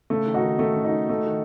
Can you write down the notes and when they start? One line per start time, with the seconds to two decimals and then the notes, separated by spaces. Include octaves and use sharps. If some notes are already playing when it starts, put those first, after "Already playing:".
0.10 C#3 A3
0.27 D#3
0.34 D#4 F#4
0.43 D#3
0.59 D#3 A3
0.76 C#3
0.85 D#4 F#4
0.92 D#3
1.09 A3
1.27 D#3